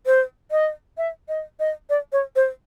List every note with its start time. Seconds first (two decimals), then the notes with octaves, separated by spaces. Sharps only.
0.06 C5
0.51 D#5
0.98 E5
1.28 D#5
1.60 D#5
1.90 D5
2.12 C#5
2.36 C5